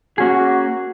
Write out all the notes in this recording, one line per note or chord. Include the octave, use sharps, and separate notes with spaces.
A#3 C#4 F#4 G#4